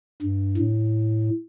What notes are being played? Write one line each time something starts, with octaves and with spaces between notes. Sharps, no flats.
G2
A2